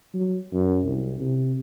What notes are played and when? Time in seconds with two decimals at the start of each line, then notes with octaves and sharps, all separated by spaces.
0.14 F#3
0.53 F#2
0.85 C2
1.20 C3